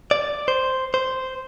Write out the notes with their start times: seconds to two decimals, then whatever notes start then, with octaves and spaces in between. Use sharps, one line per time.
0.11 D5
0.48 C5
0.94 C5